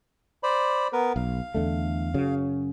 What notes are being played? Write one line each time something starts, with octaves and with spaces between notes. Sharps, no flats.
C5 D5 B5
B3 A#4 B4
B1 F5
E2 D3 A3
F#2 C#3 F#3